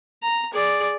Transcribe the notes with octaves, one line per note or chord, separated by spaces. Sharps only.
A#5
G#4 D5